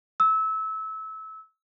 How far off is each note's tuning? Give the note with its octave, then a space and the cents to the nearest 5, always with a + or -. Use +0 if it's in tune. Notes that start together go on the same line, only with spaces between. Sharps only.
E6 -25